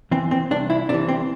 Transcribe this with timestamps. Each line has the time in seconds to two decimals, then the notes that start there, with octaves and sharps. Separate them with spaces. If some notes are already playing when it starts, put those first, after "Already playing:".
0.11 E3 C4
0.31 C4
0.51 C2 D4
0.70 E4
0.89 C3 E3 D4
1.08 C4